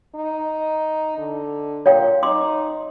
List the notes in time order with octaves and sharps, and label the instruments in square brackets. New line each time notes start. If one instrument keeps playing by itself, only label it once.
[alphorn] D#4
D3
[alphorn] A#2 [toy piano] C#5 F5 G5
[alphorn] D#4 [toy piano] C6 D6